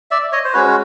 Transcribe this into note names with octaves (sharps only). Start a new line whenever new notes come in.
D5 E5
C#5 D#5
C5
G#3 C#4 F#4 B4 C#5